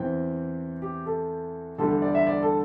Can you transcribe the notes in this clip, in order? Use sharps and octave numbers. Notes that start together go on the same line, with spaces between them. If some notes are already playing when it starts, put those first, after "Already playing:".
Already playing: E2 E3 C4 G5
G4
A4
E2 D3 G3 A4
A4
D5
E5
D5
A4